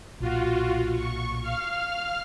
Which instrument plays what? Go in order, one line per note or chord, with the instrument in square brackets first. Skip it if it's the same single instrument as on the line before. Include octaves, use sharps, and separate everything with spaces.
[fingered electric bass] B1 A#2 [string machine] F4 F#4
[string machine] C#6
F5 F6